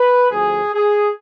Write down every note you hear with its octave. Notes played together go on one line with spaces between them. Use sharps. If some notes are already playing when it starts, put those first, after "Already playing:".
Already playing: B4
D2 D3 F3 G#4
G#4